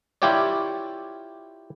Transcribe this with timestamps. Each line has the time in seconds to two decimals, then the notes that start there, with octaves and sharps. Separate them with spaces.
0.22 E4 F4 G4 C#5 D5